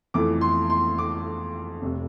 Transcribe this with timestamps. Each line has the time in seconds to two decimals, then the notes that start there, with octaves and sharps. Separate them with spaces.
0.14 F2 E3 A3 D6
0.41 C6
0.70 C6
0.98 D6
1.82 F1 C3